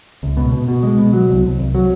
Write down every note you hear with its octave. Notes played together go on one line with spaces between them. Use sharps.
C#2
B2
B2
B2
G#3
B2
F#3
C2
C2
C2
F#3